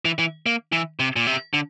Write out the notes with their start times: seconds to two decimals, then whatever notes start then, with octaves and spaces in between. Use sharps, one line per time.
0.05 E3
0.19 E3
0.46 A#3
0.73 E3
0.99 C3
1.16 A#2
1.27 C3
1.54 D3